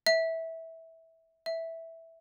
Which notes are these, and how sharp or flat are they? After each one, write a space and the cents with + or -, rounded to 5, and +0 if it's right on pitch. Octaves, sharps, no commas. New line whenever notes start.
E5 -15
E5 -5